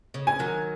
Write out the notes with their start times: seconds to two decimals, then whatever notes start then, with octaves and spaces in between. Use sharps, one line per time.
0.14 C#3
0.27 G#5
0.39 D#3 F#3